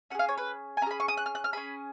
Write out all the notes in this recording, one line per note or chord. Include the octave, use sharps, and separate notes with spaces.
C#4 G#4 F5 F#5
C#5
B4
G#5
C#4 G#4 A#5 B5
C#6
D#6
F#6
F6
F#6
F6
C#4 G#4 B5